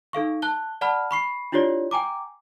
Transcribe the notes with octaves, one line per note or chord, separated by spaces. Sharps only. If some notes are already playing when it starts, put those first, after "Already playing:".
D#4 A4 F5 C#6
A5 F#6 G7
D5 F#5 A5 B5 F6
B5 C#6 C7
D4 E4 F4 G4 C#5 D5
G5 G#5 A#5 D6